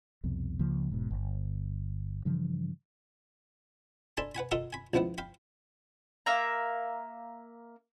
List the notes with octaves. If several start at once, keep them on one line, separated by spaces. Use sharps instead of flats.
C2 F2 B2
C#2 C#3 F3 A#3
E1 G#2 B2
G1
G2 C#3 E3 F3
D4 A4 G#5 A5 B5 C6
B4 F#5 G#5 B5
F4 A4 A#4 D#5 E5 F#5
G#5 B5
C#2 F3 B3 E4 F#5
F5 G5 B5
A#3 E5 A#5